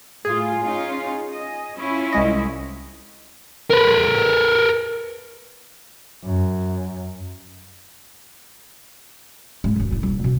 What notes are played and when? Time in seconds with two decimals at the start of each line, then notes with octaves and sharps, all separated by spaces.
0.25 A2 F4 G#4
0.62 C#4 D#4 F4
1.32 D#5
1.75 C#4 E4 F4
2.12 C2 G#3 D#5
3.71 A#4 B4
6.25 F#2
9.64 G#2
9.76 E1 D#2
9.91 D#4 E4
10.03 D#1
10.24 B2